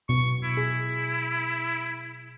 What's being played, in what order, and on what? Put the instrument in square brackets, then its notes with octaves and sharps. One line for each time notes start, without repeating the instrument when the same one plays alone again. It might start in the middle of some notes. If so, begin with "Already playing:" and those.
[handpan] B2 [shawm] C#6
[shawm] E4
[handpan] G#4